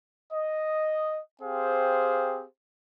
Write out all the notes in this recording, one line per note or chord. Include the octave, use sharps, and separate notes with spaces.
D#5
C4 G4 G#4 C5 F5